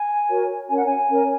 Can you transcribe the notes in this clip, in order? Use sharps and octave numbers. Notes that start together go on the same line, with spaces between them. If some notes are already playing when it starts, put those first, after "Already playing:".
Already playing: G#5
F#4 A#4 C#5
C#4 A#4 C#5 G#5
F#5
G#5
C#4 A#4 C#5